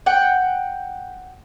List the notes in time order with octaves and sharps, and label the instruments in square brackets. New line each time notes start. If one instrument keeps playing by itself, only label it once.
[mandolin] F#5 G5